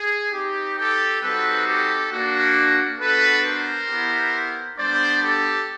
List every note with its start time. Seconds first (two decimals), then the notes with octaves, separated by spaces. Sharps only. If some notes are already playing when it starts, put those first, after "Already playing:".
Already playing: G#4
0.32 C4 D#4 G4
0.77 G4 A4
1.22 G3 C4 D#4 F#4 A4 B4
1.66 G4 A4
2.10 A#3 D4 F#4
2.99 B3 D4 F#4 A4 B4
3.44 A#4 C5
3.88 B3 E4 G4
4.77 G3 B3 D4 C5 D5
5.22 G4 A4